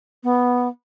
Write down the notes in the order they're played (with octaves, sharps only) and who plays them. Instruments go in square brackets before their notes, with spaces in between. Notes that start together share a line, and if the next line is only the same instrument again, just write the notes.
[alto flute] B3